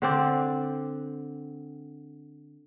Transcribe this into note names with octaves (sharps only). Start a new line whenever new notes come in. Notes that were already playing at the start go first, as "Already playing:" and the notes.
D3 C4 D5